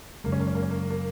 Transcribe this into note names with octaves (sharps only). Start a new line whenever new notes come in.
F#2 C#3 G#3 A#3
C#4
A#3
C#4
A#3
C#4
A#3
A#3